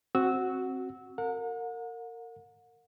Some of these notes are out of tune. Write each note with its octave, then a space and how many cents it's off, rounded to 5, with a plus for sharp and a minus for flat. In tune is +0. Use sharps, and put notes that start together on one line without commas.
C4 +15 F#4 +0 E6 -20
A#4 -30 F#5 -40